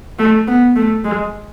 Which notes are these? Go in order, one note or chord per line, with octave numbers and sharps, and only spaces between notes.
A3
B3
A3
G#3